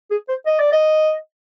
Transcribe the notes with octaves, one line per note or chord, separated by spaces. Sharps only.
G#4
C5
D#5
D5
D#5